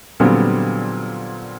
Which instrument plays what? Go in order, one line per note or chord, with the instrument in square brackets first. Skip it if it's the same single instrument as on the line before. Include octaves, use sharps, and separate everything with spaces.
[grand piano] A#2 D3 F#3 G3 B3 C4